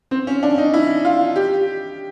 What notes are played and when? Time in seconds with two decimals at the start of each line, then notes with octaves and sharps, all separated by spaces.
0.11 C4
0.27 C#4
0.43 D4
0.58 D#4
0.74 E4
1.05 F4
1.36 G4